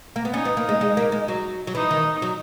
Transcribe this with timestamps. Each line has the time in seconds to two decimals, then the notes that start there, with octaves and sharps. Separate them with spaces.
0.16 A#3
0.25 B3
0.33 C#4 D#4
0.45 B3
0.57 A#3
0.69 G#3
0.81 G#3
0.97 A#3
1.12 G#3
1.28 F#3
1.67 F#3
1.75 E3 D#4
1.91 D#3
2.22 F#3